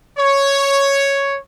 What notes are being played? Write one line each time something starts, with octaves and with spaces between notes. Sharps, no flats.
C#5